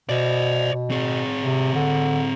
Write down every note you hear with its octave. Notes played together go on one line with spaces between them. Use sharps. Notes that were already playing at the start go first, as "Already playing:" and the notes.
B2 C5 D5
B2
C4 G#4
C3
D3